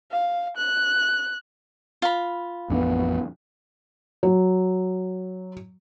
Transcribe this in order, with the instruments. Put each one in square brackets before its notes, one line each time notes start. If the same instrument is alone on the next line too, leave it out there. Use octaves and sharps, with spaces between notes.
[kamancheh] F5
F#6
[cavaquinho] F4 B5
[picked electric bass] A1 F2 D4 [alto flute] B3
[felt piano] F#3